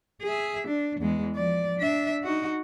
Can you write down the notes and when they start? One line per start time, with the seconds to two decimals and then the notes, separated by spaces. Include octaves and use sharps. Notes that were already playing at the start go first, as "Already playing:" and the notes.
0.22 G#4 E5
0.68 D4
1.00 E2 G#3
1.35 F3 D5
1.78 D4 E5
2.23 D#4 F#4